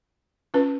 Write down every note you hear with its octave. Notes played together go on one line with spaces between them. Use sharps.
C#4 F4 B4